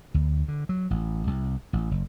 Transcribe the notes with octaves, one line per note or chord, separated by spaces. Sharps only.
D2
D3
F#3
A1
C2
A1
F#1